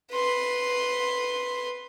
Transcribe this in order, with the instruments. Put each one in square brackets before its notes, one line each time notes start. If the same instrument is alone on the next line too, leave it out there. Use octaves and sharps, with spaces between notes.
[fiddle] B4 C6